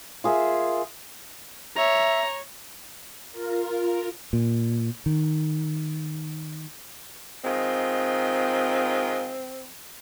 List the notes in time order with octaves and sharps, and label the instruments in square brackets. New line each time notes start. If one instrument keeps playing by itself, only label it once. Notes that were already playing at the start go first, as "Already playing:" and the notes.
[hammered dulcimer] F4 G#4 A#4 E5
[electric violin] C#5 [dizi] E5 [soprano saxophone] A#5
[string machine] F4 A#4
[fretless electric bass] A#2
D#3
[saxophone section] D#3 G#3 F4 [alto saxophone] C4